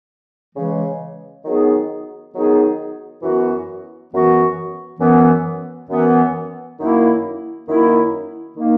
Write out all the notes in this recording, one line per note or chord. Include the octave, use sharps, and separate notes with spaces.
C#3 E3 G#3
D#3 F#3 B3 D#4 G#4
D#3 F#3 B3 D#4 G#4
F#2 E3 B3 F#4
F#2 E3 B3 F#4
F#2 E3 B3
F#2 E3 B3
F#2 D#3 A#3 E4
F#2 D#3 A#3 E4
D#3 A#3 D#4